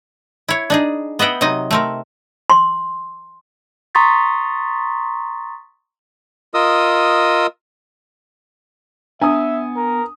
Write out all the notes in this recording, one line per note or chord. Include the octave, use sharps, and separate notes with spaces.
E4 C#5
D4 D#4 G#4
B3 D#5 E5 F#5 G5
C3 F#3 D#4 D#5
A3 C4 A#4
C6
A#5 C6 C#6 D#6 A6 B6
F4 A#4 D#5 D#6 E6
B3 D4 E5 G#5 D#6
A#4